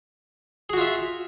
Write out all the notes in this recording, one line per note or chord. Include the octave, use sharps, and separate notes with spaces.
F4 F#4 G#4 E5